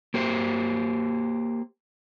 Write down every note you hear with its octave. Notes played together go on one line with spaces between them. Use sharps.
A#3 G4 C5